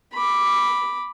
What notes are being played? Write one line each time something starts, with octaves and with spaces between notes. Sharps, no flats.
B5 D6